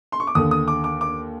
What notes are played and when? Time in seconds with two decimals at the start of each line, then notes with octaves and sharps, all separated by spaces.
0.12 C6
0.20 C#6
0.27 D6
0.35 D#2 D3 D#6
0.51 D#6
0.68 D6
0.84 D6
1.01 D6